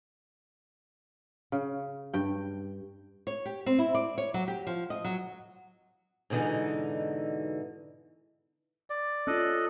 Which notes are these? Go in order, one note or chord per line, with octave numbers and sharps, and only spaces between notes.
C#3
G2 G5
C#5
G4
C4
E4
D5
C#5
F#3
G4
F3
D#5
F#3
G#2 B2 D3 E3 D#4
D5
C#4 F4 A4 D#5 F#6